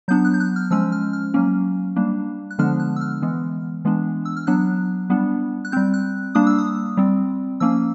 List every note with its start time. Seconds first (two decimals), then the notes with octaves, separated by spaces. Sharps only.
0.08 F#3 B3 D4 G6
0.25 F#6
0.34 G6
0.40 F#6
0.56 F6
0.71 F3 G#3 C#4 E6
0.92 F6
1.13 F6
1.34 F#3 A#3 C#4
1.96 G3 A#3 D4
2.51 F#6
2.58 D3 F3 G#3 B3 D4 F6
2.80 F#6
2.96 E6
3.01 F6
3.22 E3 G#3 B3
3.85 E3 G#3 B3 D4
4.25 E6
4.37 F6
4.47 F#3 B3 D4 F#6
5.10 G3 B3 D4
5.65 F#6
5.72 G3 C4 G6
5.94 F#6
6.35 G3 A#3 D4 D#6
6.47 E6
6.58 D#6
6.97 G3 C4
7.60 F3 A#3 C#4 E6